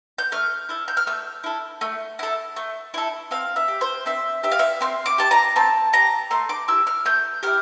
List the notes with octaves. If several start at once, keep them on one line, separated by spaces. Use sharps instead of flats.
G6
A3 F6
E4 A4
G6
F6
A3 E6
E4 A4
A3
E4 A4
A3
E4 A4
C4 F5
E5
G4
C5
C4 E5
G4 E5
F5
E5
C4 C6
D6
G4 A5
A#5
C4 A5
G4 A#5
A3 C6
D6
E4 G4 E6
F6
A3 G6
E4 G4 F6